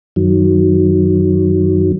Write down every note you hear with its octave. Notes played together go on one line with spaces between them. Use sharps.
F#2 D#3 F#3